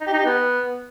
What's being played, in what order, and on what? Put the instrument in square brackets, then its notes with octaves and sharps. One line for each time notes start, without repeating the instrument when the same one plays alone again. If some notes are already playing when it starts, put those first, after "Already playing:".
[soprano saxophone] D#4
G4
D#4
G4
B3